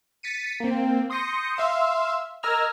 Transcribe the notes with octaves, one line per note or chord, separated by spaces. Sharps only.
A6 B6 C#7 D#7
A#3 C4
C6 D#6 G6 A#6 C#7
E5 F5 C6 E6
A#4 D#5 A#5 E6 F6 G#6